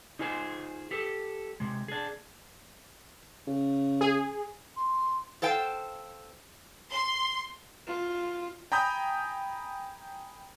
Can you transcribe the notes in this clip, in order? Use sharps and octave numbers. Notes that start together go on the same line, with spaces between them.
D#4 F4 G#4 C5 G#5
G4 A4
C3 G#3
D4 G#4
C#3
G#4
C6
A4 C5 F5 G5
C6
F4
G5 G#5 A#5 B5 D#6 G6